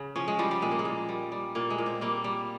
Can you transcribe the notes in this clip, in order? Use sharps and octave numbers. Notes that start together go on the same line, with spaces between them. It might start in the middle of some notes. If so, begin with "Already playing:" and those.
Already playing: C#3
F3 C#4
G#3
F3 G3
G3
A#2 G#3
A#3
G#3
A#2
G3
G3
A#2 A#3
G#3
A#2
C4
G3 A#3
G3